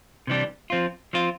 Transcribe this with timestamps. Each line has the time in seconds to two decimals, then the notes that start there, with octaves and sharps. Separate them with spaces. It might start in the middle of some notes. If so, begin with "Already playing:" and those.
0.27 C3 E3 G3 D4 G4
0.70 F3 C4 F4
1.13 F3 C4 F4